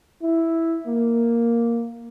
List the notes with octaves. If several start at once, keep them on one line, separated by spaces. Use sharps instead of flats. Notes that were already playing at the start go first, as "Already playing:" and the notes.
E4
A#3